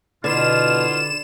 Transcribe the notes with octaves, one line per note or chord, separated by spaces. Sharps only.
B2 D3 B3 E4 F4 E7